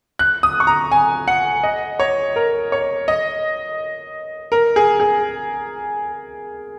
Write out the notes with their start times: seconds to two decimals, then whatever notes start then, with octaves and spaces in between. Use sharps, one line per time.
0.19 F#6
0.43 D#6
0.60 C#6
0.67 A#5
0.92 G#5
1.28 F#5
1.63 D#5
2.00 C#5
2.36 A#4
2.72 C#5
3.08 D#5
4.52 A#4
4.76 G#4
5.00 G#4